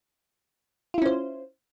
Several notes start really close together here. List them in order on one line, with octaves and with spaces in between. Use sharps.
F4 E4 C#4 C5